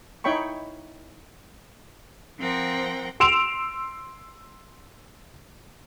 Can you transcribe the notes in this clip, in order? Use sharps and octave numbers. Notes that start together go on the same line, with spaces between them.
D#4 E4 C#5 G5 B5 C#6
F3 C4 A#4 F#5 G5 A#6
C6 E6 D7 E7 F7